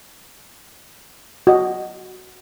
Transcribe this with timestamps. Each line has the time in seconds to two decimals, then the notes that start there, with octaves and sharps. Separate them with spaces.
1.47 F#4 D#5